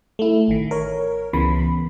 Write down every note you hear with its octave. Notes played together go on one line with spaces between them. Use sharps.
A3 E4
A1 D#3
A#4 C#5
C#2 C#3 E3 B3 B5